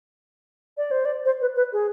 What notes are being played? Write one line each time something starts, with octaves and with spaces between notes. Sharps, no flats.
D5
C5
D5
C5
B4
B4
G#4